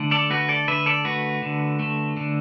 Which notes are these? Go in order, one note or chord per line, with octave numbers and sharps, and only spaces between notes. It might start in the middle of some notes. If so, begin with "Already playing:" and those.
Already playing: D3 A3
A4 D5
A3 F#4 B4
A4 D5
D3 B4 E5
A4 D5
A3 F#4 B4
D3
A3
D3